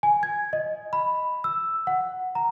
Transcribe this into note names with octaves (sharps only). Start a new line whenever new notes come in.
G#5
G#6
D#5
B5
E6
F#5
A#5